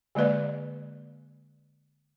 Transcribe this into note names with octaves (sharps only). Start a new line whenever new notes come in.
D3 G#3 A#3 B4 D5